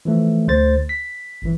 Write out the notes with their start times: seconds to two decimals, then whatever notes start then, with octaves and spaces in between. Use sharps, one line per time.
0.05 E3 F3 A3
0.48 D2 C5 A6
0.89 B6
1.42 G1 E3